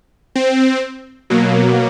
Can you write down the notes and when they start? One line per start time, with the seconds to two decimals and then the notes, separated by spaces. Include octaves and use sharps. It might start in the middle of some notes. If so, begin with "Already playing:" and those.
0.35 C4
1.30 B2 F#3 A#3